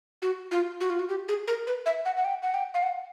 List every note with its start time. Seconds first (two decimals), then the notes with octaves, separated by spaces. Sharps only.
0.22 F#4
0.51 F4
0.80 F#4
0.90 F4
0.99 F#4
1.09 G4
1.28 G#4
1.47 A#4
1.67 B4
1.86 E5
2.05 F#5
2.17 F#5
2.25 G5
2.42 F#5
2.54 G5
2.74 F5
2.83 F#5